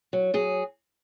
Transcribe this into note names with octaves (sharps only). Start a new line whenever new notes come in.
F#3
F#3 G#4